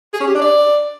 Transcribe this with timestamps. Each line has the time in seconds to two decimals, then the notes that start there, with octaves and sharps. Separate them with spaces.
0.13 G#4
0.20 C#4
0.27 G4
0.34 D4
0.41 D5